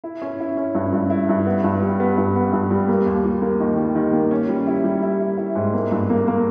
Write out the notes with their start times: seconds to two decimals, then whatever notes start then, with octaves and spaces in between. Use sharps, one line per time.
0.04 E4
0.22 C#4
0.40 E4
0.57 C#4
0.75 G2
0.93 G2
1.10 E4
1.29 G2
1.47 B3
1.64 G2
1.82 G3
2.00 B3
2.18 G2
2.36 B3
2.53 G2
2.71 G3
2.88 A#3
3.06 D#2
3.24 G3
3.42 A#3
3.60 D#3
3.77 G3
3.95 D#3
4.13 A#3
4.31 C#4
4.49 G3
4.67 E4
4.84 G3
5.02 E4
5.20 E4
5.37 E4
5.55 G#2
5.74 A#3
5.92 G2
6.10 A#3
6.28 A#3